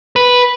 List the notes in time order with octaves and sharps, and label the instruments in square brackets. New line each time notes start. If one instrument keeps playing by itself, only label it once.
[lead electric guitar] B4